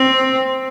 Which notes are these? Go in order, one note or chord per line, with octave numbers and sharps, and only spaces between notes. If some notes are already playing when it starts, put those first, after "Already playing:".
Already playing: C4